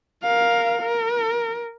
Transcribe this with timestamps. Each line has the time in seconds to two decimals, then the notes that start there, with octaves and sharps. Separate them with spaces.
0.23 A#4 F5
0.82 A#4